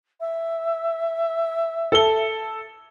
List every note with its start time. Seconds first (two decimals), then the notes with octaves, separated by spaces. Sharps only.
0.20 E5
1.92 A4 G7